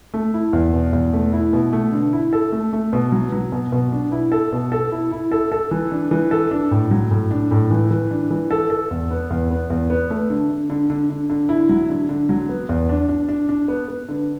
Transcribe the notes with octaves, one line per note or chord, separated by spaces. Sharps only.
A3
E4
E2
B2
E2
A3
E4
B2
A3
D3
E4
A4
A3
A3
B2
F#3
F#3
B2
B2
D4
E4
A4
B2
A4
E4
E4
A4
A4
E3
D4
E3
A4
D4
A2
F#3
A2
D4
A2
E3
E3
D4
E3
A4
A4
E2
B3
E2
B3
E2
B3
A3
D3
D3
D3
D3
D3
D3
E4
F#3
D3
D3
F#3
B3
E2
D4
D4
D4
D4
B3
B3
D3